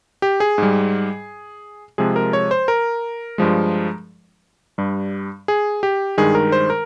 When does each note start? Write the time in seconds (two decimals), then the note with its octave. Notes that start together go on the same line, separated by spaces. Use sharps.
0.22 G4
0.40 G#4
0.58 G#2 G3
1.98 C3 F3 G#3 G#4
2.16 A#4
2.33 C#5
2.51 C5
2.68 A#4
3.38 G2 F3 G#3
4.78 G2 G3
5.48 G#4
5.83 G4
6.18 G2 D#3 G#3 G#4
6.35 A#4
6.52 C5
6.70 A#4